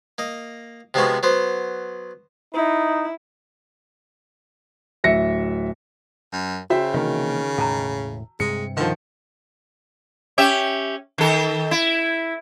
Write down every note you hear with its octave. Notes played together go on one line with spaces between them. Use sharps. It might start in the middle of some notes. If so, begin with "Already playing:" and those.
A#3 D#5
C3 F3 G#3 B3 C#4 F#4
F#3 B3 C5
D#4 E4
D1 E5 A#6 C#7
F#2
C#3 F#4 C5 E5 G5
C3 D#3 E3 A#3
E1 A2 A5 A#5
G2 C3 G#3 C#7
D3 D#3 F3
C#4 G4 E5
D#3 A4
E4